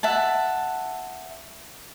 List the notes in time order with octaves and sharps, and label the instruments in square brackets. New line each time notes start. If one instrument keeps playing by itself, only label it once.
[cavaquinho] E5 F#5 A5